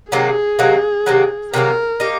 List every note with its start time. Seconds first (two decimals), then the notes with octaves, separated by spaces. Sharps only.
0.12 C3 D#3 F#3 A#3 G#4
0.59 C3 D#3 F#3 A#3
1.06 C3 D#3 F#3 A#3
1.53 C3 D#3 F#3 A#3 A#4
2.00 A#3 D#4 G4